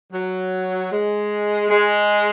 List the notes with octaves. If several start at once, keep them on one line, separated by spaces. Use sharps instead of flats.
F#3
G#3
G#3